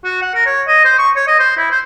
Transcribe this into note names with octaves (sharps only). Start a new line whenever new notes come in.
F#4
F#5
A#4
C#5
D#5
C5
C#6
C#5
D#5
C5
E4
C5